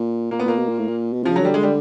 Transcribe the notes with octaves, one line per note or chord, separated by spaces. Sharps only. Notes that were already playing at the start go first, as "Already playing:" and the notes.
Already playing: A#2
A#2 A#3
B3
A#2 A#3
B2
A#2
A2
A#2
B2
C3 F3
C#3 F#3
D3 G3
G#3
G3